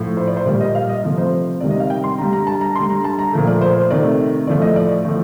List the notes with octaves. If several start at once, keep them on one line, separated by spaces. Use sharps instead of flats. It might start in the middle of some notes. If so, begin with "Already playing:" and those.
Already playing: A2 F3 A3
C5
D5
C5
A#2 G3 D5
D#5
F5
D#5
C3 F3 A3
C5
C3 D#3 G3 D5
D#5
F5
G5
C6
D3 G3 A#5
A#5
A5
A#5
D3 G3 C6
A#5
A5
A#5
A#2 F3 A3
D5
C5
C5
C3 D#3 A3 D5
A2 F3 A3 D5
D#5
D5
A2 F3 A3